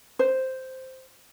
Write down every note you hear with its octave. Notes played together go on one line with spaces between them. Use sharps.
C5